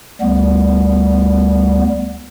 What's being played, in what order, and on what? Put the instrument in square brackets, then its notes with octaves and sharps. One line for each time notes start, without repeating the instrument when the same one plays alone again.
[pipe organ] D2 G3 B3